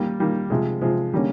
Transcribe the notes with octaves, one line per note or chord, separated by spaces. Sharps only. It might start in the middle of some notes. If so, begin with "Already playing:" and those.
Already playing: D#3 G3 A#3
D#3 G3 A#3
C3 F3 G#3
C3 F3 G#3
D3 G3 A#3 C#4